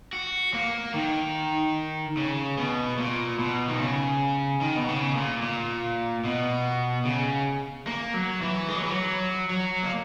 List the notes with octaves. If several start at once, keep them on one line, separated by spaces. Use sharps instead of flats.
F#4
A#3
D#3
C#3
B2
A#2
B2
D#3
C#3
D#3
B2
C#3
A#2
A#2
B2
C#3
A#3
F#3
E3
G#3
F#3
E3
F#3
F#3
A#3